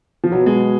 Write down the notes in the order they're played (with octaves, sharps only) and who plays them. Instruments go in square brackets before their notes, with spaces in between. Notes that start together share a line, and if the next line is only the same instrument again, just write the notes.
[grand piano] F3
[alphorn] B2 [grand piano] F#3
[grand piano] G#3